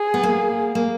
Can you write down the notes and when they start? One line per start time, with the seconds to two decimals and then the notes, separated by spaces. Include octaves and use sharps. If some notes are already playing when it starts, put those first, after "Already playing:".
Already playing: G#4
0.14 B3
0.23 A#3
0.75 A#3